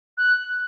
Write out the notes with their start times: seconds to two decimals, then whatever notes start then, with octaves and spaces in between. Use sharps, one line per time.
0.17 F#6